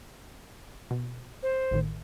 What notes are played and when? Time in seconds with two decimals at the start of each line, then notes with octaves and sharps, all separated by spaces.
0.91 B2
1.43 C5
1.71 A1 A2 D#3